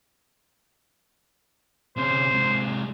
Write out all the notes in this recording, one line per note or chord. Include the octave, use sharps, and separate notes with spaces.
C3 C#4 C5
C3 G#3